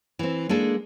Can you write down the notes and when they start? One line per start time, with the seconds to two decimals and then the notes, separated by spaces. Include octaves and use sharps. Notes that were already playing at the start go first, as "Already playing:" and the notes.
0.19 E3 C4
0.49 G#3 A#3 D4 A4